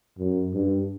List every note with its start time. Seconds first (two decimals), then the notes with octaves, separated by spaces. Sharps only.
0.19 F#2
0.54 G2